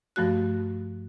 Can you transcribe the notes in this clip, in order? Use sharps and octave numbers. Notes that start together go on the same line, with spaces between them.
G2 F3 A3 F#4 F#6